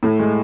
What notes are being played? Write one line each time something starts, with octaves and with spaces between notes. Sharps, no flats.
A2 A3
G#3